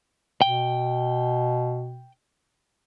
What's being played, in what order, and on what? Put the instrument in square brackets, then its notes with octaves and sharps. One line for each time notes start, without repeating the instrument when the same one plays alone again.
[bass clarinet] B2 [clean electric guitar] G5